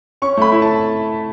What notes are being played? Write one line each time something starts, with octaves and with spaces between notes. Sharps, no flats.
C#4 C#6
A3 B5
E4
A5